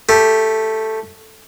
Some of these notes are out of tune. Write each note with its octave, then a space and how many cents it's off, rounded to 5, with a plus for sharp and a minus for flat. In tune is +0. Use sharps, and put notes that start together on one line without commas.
A3 +0 G4 +0